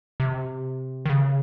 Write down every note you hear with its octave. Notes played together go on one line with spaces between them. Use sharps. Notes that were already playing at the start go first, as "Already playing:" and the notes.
C3
D#3
C#3